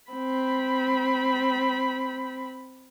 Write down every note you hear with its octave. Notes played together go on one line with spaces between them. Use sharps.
C4 B5